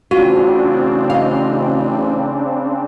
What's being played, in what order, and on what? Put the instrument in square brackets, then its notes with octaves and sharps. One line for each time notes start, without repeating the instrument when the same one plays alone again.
[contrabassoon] A1 [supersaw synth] C#3 C4 D4 [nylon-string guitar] F4 [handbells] F#4
[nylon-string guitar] D#5 F5